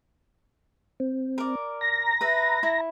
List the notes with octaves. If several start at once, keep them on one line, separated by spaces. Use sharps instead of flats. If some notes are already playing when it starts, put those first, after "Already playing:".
C4
A#4 D5
A#5 A#6
B4 E5
E4